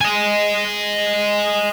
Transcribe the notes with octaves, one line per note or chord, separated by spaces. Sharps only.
D#5 G#5